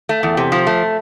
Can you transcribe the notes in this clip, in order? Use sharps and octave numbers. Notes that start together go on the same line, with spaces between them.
A3
E2
C3
F3
A3